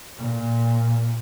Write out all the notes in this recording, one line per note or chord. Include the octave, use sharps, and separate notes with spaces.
A#2